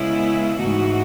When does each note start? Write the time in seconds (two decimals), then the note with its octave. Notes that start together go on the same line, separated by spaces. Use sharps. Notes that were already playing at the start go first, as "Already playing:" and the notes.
Already playing: C#3 G#3 B3 E4
0.59 G#2 E3 A3 D#4 F#4